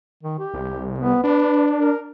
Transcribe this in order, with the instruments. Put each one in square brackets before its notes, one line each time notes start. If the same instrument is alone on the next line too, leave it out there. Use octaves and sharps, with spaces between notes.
[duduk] D#3
G4
[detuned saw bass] C2
[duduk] B3
[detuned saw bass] D4 [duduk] B4
[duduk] A#4